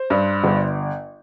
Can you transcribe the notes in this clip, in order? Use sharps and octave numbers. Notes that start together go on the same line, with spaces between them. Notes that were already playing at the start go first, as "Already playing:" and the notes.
Already playing: C5
G2
G1